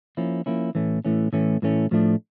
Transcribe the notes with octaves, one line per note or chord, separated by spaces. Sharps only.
F3 A#3 C#4 E4
F3 A#3 C#4 E4
A2 E3 A3 C#4
A2 E3 A3 C#4
A2 E3 A3 C#4
A2 E3 A3 C#4
A2 F3 A3 D4